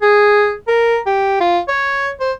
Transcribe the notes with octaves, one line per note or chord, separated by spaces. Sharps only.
G#4
A#4
G4
F4
C#5
C5